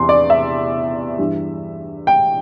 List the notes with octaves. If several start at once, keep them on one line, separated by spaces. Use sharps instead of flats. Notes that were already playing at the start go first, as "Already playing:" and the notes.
Already playing: E2 C3 E3 C6
D5
E5
G2 E3 G3
G5